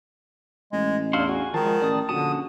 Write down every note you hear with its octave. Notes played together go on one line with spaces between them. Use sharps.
A1 G#3
E2 D4 E4 F#4 F5 C6
F#4 G#5
D#3 F3 G#3 A5
A1 D5 D#6
A#1 D3 C#4 F#4 A5 D#6